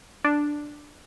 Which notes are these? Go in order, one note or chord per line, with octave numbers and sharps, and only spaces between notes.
D4